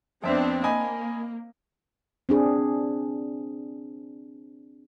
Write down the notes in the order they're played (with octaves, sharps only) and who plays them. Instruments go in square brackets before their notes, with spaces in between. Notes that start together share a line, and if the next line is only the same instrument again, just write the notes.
[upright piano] F2 E5 [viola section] B3 C4 D4
[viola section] A#3 [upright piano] D#5 G#5 B5
[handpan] C4 D4 G#4